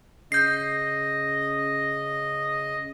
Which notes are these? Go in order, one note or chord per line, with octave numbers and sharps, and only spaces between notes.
C#3 D#5 G6 C7